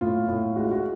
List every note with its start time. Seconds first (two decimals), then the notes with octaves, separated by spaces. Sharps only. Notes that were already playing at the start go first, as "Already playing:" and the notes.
0.01 A2 F4
0.28 A2 F4
0.56 G#3 F#4
0.64 F4
0.71 F#4